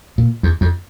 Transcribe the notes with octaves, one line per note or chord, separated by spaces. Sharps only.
A#2
E2
F2